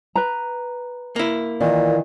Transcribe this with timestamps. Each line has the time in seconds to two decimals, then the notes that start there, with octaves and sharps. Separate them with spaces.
0.16 B4 A#5
1.16 A#3 E4
1.60 A#2 D#3 E3